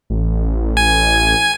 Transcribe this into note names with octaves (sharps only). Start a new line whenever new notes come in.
A1
G#5